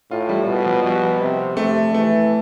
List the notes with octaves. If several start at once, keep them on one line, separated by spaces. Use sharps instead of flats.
A2 F4
G3
B2
F3
B2 G3
C3
C3 A3
E3 A3